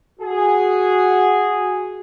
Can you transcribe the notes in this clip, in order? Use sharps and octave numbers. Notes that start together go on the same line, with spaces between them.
F#4 G#4